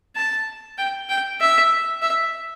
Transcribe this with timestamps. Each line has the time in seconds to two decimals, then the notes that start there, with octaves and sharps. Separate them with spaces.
0.16 A5
0.78 G5
1.09 G5
1.40 E5
2.02 E5